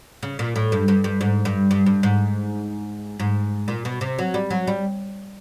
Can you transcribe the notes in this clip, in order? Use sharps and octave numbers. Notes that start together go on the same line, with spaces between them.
C#3
A#2
A2
G2
G2
G2
G#2
G2
G2
G2
G#2
G#2
A#2
B2
C3
F#3
G3
F#3
G3